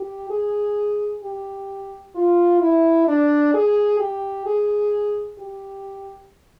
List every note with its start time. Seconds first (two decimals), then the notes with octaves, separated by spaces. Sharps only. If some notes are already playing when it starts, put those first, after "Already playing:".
Already playing: G4
0.30 G#4
1.23 G4
2.15 F4
2.61 E4
3.08 D4
3.54 G#4
4.00 G4
4.46 G#4
5.39 G4